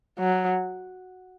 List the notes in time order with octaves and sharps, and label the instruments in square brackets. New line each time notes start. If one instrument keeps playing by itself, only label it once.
[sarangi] F#3